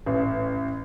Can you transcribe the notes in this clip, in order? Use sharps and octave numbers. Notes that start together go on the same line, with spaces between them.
A1